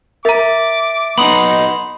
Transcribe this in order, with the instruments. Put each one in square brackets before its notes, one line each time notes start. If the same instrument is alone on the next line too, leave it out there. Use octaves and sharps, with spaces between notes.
[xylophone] A#4 A#5 [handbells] E5 A6 [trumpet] D6
[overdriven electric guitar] B3 D#4 [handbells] B5 C6 D#6 [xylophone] F#7